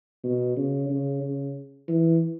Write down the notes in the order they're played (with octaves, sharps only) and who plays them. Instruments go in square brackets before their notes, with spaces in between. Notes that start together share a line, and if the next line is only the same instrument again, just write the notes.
[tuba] B2
C#3
C#3
C#3
E3